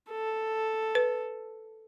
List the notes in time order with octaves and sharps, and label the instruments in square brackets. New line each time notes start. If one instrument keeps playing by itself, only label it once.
[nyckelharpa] A4
[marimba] B4